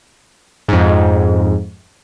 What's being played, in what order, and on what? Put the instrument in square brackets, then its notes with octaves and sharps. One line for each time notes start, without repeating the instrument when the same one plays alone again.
[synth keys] F2 G#2